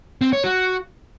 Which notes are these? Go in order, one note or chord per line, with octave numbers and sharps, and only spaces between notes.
C4
C#5
F#4